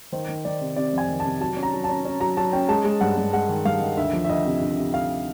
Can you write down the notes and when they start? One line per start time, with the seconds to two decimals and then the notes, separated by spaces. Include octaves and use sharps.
0.12 D#3 C5
0.28 D#3
0.45 D#3 D5
0.61 C3
0.76 C3 D5
0.93 F2 G#5
1.09 D#3
1.20 C3 A5
1.41 F#3 A5
1.57 C#4
1.63 A#5
1.73 F#3
1.84 C#4 A5
2.05 C#4
2.21 F#3 A#5
2.37 F#3 A5
2.53 C#4 G5
2.68 G#3 A5
2.84 G#3
3.01 G2 F#5
3.18 G2
3.33 G#3 F#5
3.49 D#3
3.65 G2 F5
3.81 D#3
3.97 D2 E5
4.13 F3
4.25 E5
4.29 D2 D#5
4.46 C3
4.61 D2
4.78 C3
4.93 D2 F5